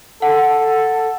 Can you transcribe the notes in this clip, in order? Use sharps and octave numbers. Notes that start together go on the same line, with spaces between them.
A4 F#5